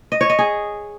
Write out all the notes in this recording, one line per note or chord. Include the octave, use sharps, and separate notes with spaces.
D#5
C#5
D#5
G#4